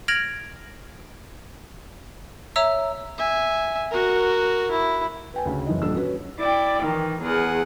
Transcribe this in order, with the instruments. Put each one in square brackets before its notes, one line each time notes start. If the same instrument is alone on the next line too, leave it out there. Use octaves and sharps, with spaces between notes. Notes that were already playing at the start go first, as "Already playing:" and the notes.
[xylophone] F6 G#6 A#6 D7 F7 F#7
C#5 E5 A#5 E6
[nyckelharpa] E5 G#5
F#4 A#4
E4
[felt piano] B4 G5 G#5
D2 C#3
F#1 E3 D#5
D#1 D4 E6
C#4 F#4 B4 C#5
[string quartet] E4 D5 G5
D#3 E3
E2 G#4 F#5